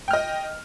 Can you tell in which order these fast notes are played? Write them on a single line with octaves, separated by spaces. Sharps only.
G5 F6 D#5